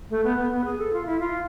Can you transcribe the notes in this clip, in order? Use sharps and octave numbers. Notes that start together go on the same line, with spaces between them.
A3
B3
B3
B3
G#4
A4
F4
E4
F4